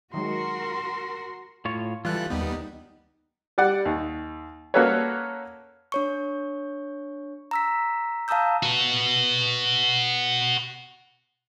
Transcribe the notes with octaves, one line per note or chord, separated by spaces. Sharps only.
D#3 F#3 G#3 F#4 A#4 C6
A2 F4 C#5
E3 G3 F4 A4 F#6
D#2 G3 B3 D#4
G3 D5 F#5
D#2
A#3 C#4 F#4 A4 B4 C#5
D4 C#5 C#6
A#5 E6 B6
F5 A5 A#5 D#6 E6 G6
F#4 B4